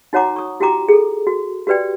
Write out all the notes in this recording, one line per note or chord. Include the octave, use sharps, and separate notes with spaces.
D#4 F#4 C#5 F#5 A#5 D6
C#6 D#6
E4 F#4 G4 G5 A#5 D6
G#4 A4
F#4
F#4 G4 B4 D5 G5